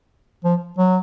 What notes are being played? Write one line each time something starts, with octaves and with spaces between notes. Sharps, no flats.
F3
F#3